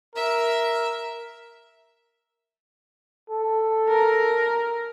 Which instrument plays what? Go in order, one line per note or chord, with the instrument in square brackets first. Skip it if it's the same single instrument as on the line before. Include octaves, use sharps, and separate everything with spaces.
[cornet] A#4 [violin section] E5
[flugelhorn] A4
[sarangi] A#4